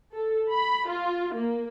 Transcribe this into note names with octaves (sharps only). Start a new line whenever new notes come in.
A4
B5
F4
A#3